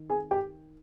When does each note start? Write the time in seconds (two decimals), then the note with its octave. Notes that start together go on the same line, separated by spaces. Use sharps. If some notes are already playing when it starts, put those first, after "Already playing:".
Already playing: D#3
0.10 G#4 G#5
0.31 G4 G5